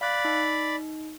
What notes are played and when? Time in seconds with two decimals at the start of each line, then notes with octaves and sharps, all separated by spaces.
0.01 D5 F5 B5 F#6
0.25 D#4